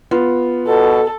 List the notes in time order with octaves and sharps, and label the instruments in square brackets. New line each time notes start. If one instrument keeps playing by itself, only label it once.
[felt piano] B3 F4
[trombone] B2 [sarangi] A4